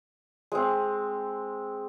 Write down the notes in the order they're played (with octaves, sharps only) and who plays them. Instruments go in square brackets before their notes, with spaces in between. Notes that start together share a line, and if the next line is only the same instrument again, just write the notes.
[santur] G#3 C4